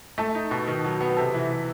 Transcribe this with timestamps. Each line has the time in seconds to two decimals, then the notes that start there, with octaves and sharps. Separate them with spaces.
0.18 A3 A4
0.35 D#4
0.51 B2
0.68 D#3
0.84 F#3
1.01 B3
1.17 C3 A4
1.34 E3